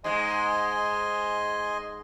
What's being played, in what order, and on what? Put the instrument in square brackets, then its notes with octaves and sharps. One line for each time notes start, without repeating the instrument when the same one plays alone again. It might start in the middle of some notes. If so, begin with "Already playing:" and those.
[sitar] G#2 G#3 [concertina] D#5 G#5 C6